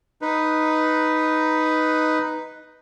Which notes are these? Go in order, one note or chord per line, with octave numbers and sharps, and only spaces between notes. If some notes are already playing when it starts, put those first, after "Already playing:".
D#4 B4